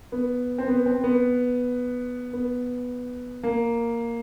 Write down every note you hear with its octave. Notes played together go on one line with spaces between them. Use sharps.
B3
C4
B3
C4
B3
B3
A#3